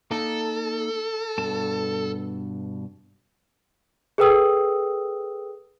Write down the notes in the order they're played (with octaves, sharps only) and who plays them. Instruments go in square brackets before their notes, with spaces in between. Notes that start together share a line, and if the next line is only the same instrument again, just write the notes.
[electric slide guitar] A#3 D#4 [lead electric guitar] A4
[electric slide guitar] G2 B2 A5
[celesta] G#4 A4 B4 G5 D#6 E6